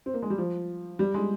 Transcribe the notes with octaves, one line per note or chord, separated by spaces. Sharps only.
C4
A#3
G#3
G3
F3
G3
G#3